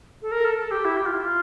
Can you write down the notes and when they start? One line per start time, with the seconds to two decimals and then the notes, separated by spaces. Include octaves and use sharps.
0.22 A4
0.32 A#4
0.45 A4
0.58 A4
0.71 G4
0.85 E4
0.97 G4
1.06 F4
1.15 E4
1.24 F4